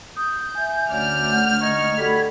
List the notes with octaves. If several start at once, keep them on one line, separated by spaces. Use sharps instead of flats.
D#6 G6
E5 G#5
D2 F#3 C#4 D5 F6 G6
F#5
D#4 D#5 C#6 G#6
G3 F#4 A4 F#5 B5